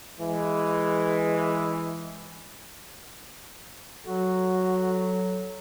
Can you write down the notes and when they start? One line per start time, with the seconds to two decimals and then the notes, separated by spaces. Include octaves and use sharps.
0.19 E3 G#3
4.06 F#3 F#4 A4